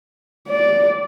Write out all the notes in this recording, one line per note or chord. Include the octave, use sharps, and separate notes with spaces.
D5